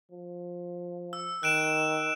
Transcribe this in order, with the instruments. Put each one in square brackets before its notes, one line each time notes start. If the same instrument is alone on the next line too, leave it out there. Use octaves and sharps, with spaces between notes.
[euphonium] F3
[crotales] E6
[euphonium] D#3 [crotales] F#6 D7 E7